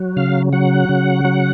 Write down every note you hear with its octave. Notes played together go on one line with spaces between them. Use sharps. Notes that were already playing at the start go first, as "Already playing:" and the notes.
Already playing: F#3
C#3 F5
F#3 F#5
C#3
F#3